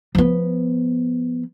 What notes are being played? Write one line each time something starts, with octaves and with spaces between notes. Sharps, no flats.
F3 B3